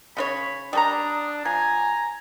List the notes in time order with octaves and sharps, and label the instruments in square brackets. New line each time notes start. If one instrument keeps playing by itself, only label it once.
[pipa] C#3 F4 C#5 [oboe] B5
[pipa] G3 A4 A#5 [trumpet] D4 [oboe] D#6
[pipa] F3 [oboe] G#5 [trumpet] A#5